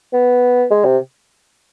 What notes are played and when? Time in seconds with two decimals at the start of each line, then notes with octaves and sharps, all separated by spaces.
0.13 B3
0.71 G#3
0.84 C3